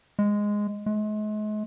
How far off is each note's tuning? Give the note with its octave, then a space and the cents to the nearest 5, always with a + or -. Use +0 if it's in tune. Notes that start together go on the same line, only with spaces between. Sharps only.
G#3 -5
G#3 +40